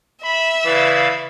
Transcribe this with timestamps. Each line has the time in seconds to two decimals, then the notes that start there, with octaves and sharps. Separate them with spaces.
0.24 E5 B5
0.65 C#3 E3 E4 D5 F5